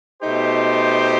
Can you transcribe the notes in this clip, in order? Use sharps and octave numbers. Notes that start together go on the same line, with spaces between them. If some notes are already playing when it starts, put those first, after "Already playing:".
B2 A3 D#4 G4 C5